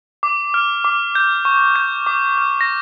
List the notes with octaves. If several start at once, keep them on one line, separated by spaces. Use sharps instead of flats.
D6
F6
D6
G6
C#6
G6
D6
F6
A#6